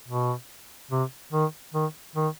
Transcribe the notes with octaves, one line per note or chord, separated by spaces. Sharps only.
B2
C3
D#3
D#3
D#3